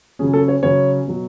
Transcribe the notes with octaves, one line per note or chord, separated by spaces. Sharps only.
C#3 F#3 C#4 G#4
A4
C#5
C#3 F#3 C#4 C#5
B2 F#3